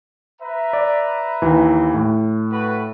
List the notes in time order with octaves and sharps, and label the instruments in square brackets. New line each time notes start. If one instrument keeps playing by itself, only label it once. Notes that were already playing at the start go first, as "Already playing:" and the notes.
[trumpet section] B4 E5 A#5
[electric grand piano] D5
D#2 E3
A2
[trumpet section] F#4 A4 B4